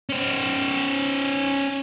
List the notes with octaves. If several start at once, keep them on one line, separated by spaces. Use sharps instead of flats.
C#4 C5